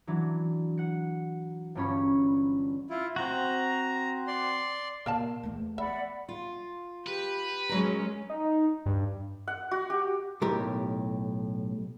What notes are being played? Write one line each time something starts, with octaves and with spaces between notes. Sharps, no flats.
E3 F#3 D4
F#5 C#7
G1 G2 G3 C#4 C#5 B5
E4 F4
C4 F#4 A#5
D5 C6
A#2 B3 A#4 F5 A5
E2 A3
B3 D5 E5 F#5 B5
F4
G4 B4
F#3 G#3 C#4 A#4
D#4
G2
F#5
F#4
G4
B1 A2 G4 A#4